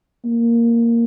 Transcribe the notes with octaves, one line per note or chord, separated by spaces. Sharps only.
A#3